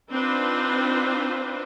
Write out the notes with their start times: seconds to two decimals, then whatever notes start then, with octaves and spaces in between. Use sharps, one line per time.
0.13 C4 D4 D#4 F4 B4 C5